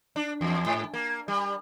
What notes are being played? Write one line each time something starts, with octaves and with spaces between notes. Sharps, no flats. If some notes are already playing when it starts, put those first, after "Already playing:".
D4
E2
G#2
A#3
G3